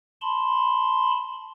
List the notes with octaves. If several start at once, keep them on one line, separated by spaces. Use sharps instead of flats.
A5 B5 C6